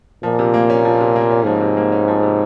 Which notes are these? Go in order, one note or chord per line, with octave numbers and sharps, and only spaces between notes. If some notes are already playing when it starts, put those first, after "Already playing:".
A#2 F3
C3
A#3
C#4
F3
C3
A#3
C#4
G#2 F3
C3
A#3
C#4
F3
C3